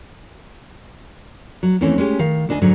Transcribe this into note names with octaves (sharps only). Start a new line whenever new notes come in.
F#3
D#2 E3 A3 C4 C#4
G#3 C#4 G4
D#3 F5
D2 D4 D#5 G#5
G#2 D3 F#3